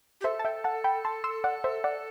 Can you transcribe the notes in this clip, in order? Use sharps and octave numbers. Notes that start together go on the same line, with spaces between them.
G4
A4 C5 E5
A5
E5 G5
F#5 A5
G5 B5
A5 C6
C6 E6
D5 F#5
C5 E5
D5 F#5